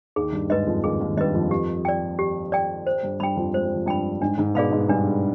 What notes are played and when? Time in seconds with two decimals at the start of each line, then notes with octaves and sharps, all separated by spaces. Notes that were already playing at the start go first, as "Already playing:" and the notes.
0.16 D#2 D#3 G#4
0.33 G2 G3
0.50 G#2 G#3 B4 D#5
0.67 F2 F3
0.83 D#2 D#3 G#4
1.00 D#2 D#3
1.17 G2 G3 B4 D#5
1.34 F2 F3
1.51 G4
1.85 D5 G5
2.19 G4
2.52 D5 G5
2.87 C5
3.03 G2 G3
3.20 G2 G3 G5 B5
3.36 F2 F3
3.54 G#3 C5
3.65 G3
3.75 F3
3.86 G2 G3 G5 B5
4.22 G#2 G#3 D4
4.38 G#2 G#3
4.55 B2 B3 G#4 D5 F5 B5
4.72 G#2 G#3
4.88 G2 G3 D4